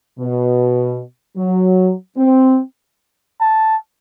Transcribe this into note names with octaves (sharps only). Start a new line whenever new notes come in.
B2
F#3
C4
A5